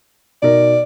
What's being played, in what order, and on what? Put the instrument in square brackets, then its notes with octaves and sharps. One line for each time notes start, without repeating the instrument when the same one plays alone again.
[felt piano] B2 D#4 A#4 [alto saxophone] D5